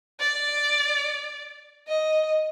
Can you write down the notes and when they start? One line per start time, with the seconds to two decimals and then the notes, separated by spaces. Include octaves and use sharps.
0.20 D5
1.88 D#5